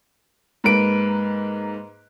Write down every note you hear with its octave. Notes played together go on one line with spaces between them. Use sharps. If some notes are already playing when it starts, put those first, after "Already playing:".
G#2 A#3 B4 D7